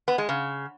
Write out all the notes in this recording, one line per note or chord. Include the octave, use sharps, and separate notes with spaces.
B3
G#3
C#3